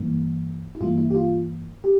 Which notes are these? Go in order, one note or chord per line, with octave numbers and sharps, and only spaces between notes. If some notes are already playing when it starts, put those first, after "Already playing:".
Already playing: G2 E3 A#3
E4
G2 E3 A#3 F4
E4
G4
F4
G4